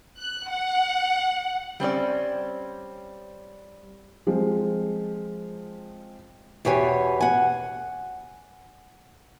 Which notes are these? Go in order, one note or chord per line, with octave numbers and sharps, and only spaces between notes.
F#6
F#5
G3 C4 C#4 D5
F3 G#3 C4
E2 B2 G4 C#5 G#5
F#5 G#5